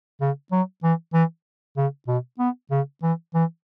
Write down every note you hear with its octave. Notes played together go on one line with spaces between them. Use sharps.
C#3
F#3
E3
E3
C#3
B2
B3
C#3
E3
E3